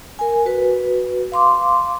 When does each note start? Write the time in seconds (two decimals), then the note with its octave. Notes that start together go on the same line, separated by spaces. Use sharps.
0.19 A#4 G#5
0.45 F#4 B4
1.32 F5 C6 D6